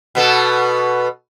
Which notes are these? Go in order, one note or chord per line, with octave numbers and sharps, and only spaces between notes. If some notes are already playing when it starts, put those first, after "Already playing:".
B2 B3 A4